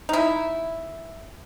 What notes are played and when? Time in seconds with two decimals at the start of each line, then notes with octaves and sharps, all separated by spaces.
0.09 D#4 E4